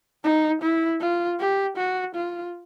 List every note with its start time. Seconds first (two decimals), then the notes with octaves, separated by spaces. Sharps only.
0.24 D#4
0.62 E4
1.01 F4
1.39 G4
1.77 F#4
2.15 F4